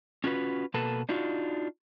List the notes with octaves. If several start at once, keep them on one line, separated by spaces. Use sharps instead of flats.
C#4 F4 F#4 B4
B2 A#3 A4 B4 A5
D4 D#4 F4 F#4